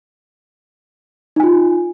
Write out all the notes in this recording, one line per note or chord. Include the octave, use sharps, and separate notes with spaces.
D#4 F4 G#5